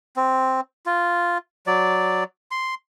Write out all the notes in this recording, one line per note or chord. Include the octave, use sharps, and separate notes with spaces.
C4
F4
F#3 D5
C6